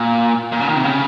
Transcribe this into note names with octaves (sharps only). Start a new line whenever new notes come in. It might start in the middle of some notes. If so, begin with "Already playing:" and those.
Already playing: A#2
A#2
C#3
D#3
C3
C#3